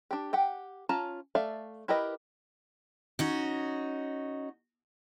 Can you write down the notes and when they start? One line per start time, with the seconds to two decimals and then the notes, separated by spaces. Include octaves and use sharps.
0.11 D4 G4
0.33 G4 F#5 G5
0.89 C#4 F4 A5 A#5
1.35 A3 D5 E5 F5
1.88 E4 G4 A#4 B4 D#5
3.19 C#4 D#4 F#4